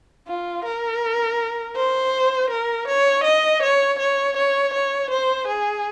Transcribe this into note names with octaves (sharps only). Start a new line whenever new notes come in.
F4
A#4
C5
A#4
C#5
D#5
C#5
C#5
C#5
C#5
C5
G#4